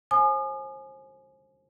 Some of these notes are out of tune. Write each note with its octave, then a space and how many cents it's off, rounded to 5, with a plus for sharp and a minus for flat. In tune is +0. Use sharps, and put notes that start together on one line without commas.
C5 +35 G#5 +20 D#6 -40